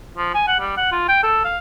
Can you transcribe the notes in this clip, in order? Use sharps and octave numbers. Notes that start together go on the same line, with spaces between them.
F3
G#5
F#5
G3
F#5
F4
G5
A4
F5